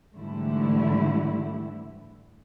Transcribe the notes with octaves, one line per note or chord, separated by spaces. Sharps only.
G#2 D3 E3 G3 A3 E4